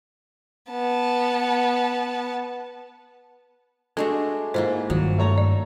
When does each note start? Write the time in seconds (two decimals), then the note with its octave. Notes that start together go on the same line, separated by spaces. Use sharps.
0.71 B3 A5
3.97 G#3 A3 D4 F#4 A4
4.54 G#2 A#3 E4 F4 C5
4.90 G2 D#3 F#3
5.18 A3 C#5 A#5
5.38 D5